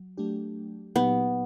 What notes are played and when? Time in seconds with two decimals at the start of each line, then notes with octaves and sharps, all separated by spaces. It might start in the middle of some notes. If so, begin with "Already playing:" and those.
Already playing: F#3
0.18 F#3 A3 D4 G4
0.96 A#2 F#3 A#3 B3 D#4 G4